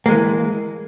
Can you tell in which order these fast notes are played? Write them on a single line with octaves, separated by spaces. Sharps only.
A#3 G#3 E3